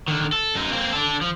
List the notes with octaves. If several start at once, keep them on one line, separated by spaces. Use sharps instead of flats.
D3 D#3
A4
F#2 D#4
A#3 C4
D4 A4
F3